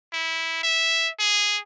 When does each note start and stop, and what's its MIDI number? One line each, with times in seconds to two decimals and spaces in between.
0.13 0.59 64
0.63 1.09 76
1.19 1.59 68